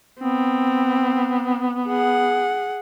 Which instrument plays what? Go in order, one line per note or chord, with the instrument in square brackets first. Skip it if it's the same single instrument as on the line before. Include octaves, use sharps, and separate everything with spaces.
[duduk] B3 [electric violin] C4
[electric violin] G#4 F#5